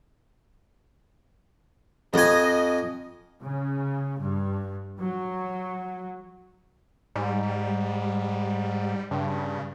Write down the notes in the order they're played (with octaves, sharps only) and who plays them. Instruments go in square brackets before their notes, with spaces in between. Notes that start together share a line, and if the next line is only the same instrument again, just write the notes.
[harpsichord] F2 G#5 [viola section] D#5
[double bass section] C#3
G2
F#3
[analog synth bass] G#2 [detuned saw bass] G3
[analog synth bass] G2 [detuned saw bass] C#3